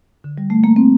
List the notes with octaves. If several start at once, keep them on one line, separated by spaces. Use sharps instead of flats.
D3
G3
A3
A#3
C4